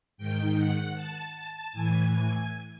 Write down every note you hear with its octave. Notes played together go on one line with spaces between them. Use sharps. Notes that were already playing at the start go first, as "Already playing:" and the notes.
G#2 D#3 G5
F#5
A5
A5
A2 E3 G#5
G#5